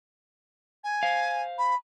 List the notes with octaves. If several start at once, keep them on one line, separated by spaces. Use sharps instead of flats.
G#5
C5 F5
B5